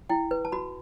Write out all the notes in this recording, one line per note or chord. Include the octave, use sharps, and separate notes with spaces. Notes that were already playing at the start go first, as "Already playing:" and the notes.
E4 G5
B4
A5
F#4 B5